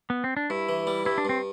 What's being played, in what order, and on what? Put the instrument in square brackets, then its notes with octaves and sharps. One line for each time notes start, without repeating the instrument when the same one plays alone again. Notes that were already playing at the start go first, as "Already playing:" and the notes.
[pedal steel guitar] B3
C4
D4
[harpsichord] G2 [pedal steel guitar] E4
[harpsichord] E3
G3
[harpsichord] G2 [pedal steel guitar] E4
[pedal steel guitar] D4
[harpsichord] G2 [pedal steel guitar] C4